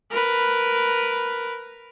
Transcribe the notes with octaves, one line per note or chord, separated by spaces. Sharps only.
A#4 B4